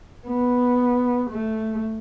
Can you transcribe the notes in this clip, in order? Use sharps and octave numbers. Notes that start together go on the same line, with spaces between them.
B3
A3